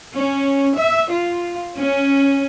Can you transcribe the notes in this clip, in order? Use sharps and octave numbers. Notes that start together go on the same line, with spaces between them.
C#4
E5
F4
C#4